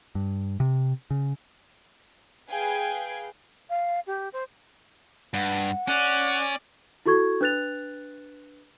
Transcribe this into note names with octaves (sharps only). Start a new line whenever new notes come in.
G2
C3
C#3
G#4 B4 F5 G5 G#5
F5
G4
C5
G2 F#5
C#4 D5 F#6
E4 F#4 A4 C#6 G#6
D4 B4 F#6 A6 F7